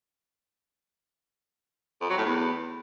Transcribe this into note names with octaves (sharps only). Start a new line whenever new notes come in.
F2
F#3
A2
E2